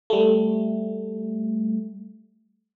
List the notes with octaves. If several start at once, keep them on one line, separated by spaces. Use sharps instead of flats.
G3 A3